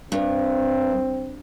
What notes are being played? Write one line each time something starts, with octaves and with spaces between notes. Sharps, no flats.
G2 C4